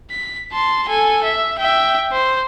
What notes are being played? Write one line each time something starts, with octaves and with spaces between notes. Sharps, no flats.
B6
A5 C6
A4 G#5
E5
E5 G5
C5